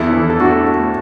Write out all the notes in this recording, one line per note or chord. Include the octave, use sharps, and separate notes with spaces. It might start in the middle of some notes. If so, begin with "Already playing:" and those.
Already playing: E2 E4 A4
E3
A4
A3 D4 F#4
A3